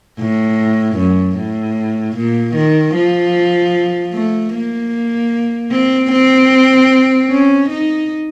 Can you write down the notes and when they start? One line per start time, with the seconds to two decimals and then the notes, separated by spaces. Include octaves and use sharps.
0.19 A2
0.97 F#2
1.36 A2
2.16 A#2
2.55 D#3
2.94 F3
4.13 A3
4.53 A#3
5.71 C4
6.12 C4
7.30 C#4
7.69 D#4